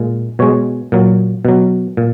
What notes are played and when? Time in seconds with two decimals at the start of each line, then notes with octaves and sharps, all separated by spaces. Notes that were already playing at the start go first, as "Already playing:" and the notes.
Already playing: A#2 G#3
0.39 B2 G#3 C#5
0.92 A#2 F#3
1.45 B2 F#3
1.97 A#2